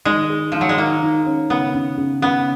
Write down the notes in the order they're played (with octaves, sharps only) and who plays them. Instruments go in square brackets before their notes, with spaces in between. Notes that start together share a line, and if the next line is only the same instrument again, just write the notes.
[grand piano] D#3 [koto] G#3
[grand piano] G#4
[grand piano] D#3 [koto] F3
[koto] F#3
G#3
[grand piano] D#3 [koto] A#3
[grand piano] D#3
C#4
[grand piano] C#3 [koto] B3
[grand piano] C#3
C#3
[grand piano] C#3 [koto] B3